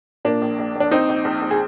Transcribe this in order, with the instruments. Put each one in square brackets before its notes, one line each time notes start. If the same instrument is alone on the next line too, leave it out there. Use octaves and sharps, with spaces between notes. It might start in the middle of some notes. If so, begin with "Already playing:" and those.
[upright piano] A#2 A#3 D4
A#1
A#1
A#1 D4
A#1 C4 D#4
A#1
A#1
A#1
G#4